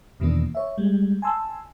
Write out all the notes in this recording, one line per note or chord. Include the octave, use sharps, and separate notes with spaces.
E2 B2 D#3 E3 A#3 D4
C#5 E5
G3 G#3
G#5 A5 C6 E6